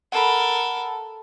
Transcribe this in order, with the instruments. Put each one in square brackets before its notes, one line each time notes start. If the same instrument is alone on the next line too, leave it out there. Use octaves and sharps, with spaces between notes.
[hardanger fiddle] A4 A#4 [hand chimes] F#5 A5 B5